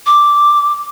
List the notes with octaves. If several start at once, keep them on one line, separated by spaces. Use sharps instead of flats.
D6